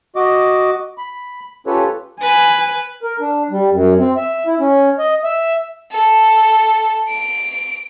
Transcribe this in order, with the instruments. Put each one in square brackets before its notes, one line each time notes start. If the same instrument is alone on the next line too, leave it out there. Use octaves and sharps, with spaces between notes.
[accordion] F#4 D#5 D6
B5
C#4 F4 G4 A4 B4 C#5
[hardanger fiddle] B4 [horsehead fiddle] G#5
[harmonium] A#4
D4
G3
F#2
C4
E5
E4
C#4
D#5
E5
[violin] A4
D7